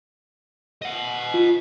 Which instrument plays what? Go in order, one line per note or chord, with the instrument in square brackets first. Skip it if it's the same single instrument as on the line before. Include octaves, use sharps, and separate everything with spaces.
[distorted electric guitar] D#5 F#5
[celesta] F4